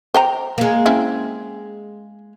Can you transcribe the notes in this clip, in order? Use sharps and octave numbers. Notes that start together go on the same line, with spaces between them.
C5 G5 A#5
G#3 A#3
C4 C#4 E4